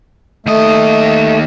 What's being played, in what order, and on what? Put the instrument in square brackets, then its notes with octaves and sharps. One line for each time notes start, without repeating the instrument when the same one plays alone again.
[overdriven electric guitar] D#2 D#5 [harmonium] A3